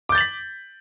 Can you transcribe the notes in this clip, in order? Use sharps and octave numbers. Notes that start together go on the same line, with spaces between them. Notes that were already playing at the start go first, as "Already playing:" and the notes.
D6 G6 A6 B6 F#7